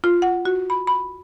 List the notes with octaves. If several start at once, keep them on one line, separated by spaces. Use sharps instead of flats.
F4
F#5
F#4
B5
B5